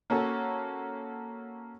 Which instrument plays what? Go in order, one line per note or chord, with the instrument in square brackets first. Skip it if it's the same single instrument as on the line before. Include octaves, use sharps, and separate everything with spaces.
[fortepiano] A#3 C#4 F#4 A4